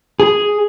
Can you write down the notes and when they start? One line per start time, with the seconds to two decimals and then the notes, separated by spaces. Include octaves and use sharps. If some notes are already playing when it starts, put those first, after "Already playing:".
0.20 G#4